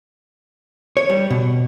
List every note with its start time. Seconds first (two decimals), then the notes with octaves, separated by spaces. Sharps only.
0.97 C#5
1.10 G3
1.30 B2